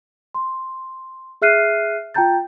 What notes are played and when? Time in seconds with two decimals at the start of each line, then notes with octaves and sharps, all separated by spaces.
0.35 C6
1.42 G#4 E5 F6 F#6 C7 D#7
2.14 F4 G5 A5 A#5 G6 A6